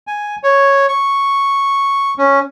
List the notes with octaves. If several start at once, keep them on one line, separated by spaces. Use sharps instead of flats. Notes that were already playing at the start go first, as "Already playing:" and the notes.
G#5
C#5
C#6
C#4